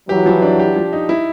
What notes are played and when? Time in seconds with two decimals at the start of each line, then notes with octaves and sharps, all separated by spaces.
0.09 E3 F#3 G4
0.26 F3
0.42 D4
0.59 G4
0.76 F3
0.93 D#4
1.09 E4